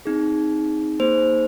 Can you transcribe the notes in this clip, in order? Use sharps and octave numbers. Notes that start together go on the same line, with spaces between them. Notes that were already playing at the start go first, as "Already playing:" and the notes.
C4 D#4 G#4
A#3 D#4 G#4 C5